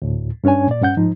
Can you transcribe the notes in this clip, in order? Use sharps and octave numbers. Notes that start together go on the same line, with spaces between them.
D2 A2
G2 C#4 D4 C#5 G#5
A#2 D5
G2 C#4 F#5 G6
G#2 F3 D#4